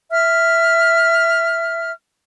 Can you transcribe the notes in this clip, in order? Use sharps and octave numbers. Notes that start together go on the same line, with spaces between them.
E5 F6